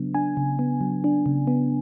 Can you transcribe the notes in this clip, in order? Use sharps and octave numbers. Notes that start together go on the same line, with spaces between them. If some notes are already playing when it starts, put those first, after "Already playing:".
Already playing: C#3 F#3 B3 D4
D4 G#5
C#3
B3
F#3
D4
C#3
B3